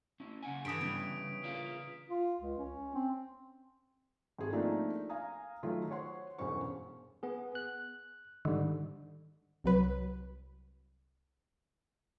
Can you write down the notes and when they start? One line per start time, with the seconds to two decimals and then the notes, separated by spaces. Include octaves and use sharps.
0.20 C#4 E4
0.43 C#3 F#5 G#5
0.65 G2 E3 A4 D#6 B6 D7
0.81 C#3 G3 B3
1.43 F4 D5 F5
2.08 F4
2.41 C#2
2.58 C#4
2.95 C4
4.38 G#1 G#4 A4
4.53 F3 A3 A#3 C4 D4 D#4
5.10 F5 G#5 A#5 D#6
5.63 D#3 F#3 A3 F4
5.90 C5 C#5 F#5 C6
6.38 E1 B1 G2 C#4 C5 C#6
7.23 B3 G#4
7.55 F#6
8.45 G#2 D3 D#3 G3
9.64 C2 F#3 B4